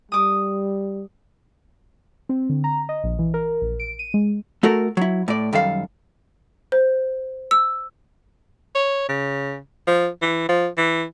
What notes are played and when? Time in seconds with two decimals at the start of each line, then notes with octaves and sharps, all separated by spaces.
0.12 G3 D6 D#6
2.29 C4
2.49 D3
2.64 A#5
2.89 D#5
3.04 A#1
3.19 E3
3.34 A#4
3.62 A#1
3.80 D7
3.99 D#7
4.14 G#3
4.63 A3 F#4 A4 A#4
4.97 F#3 E4
5.28 A2 D5
5.53 F#2 D#3 G3 A4 F5
6.72 C5
7.51 E6
8.75 C#5
9.09 C#3
9.87 F3
10.22 E3
10.49 F3
10.78 E3